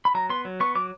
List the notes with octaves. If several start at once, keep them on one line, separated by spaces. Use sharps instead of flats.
B5
F#3 A#5
B3 C6
F#3
B3 C#6
F#3 D6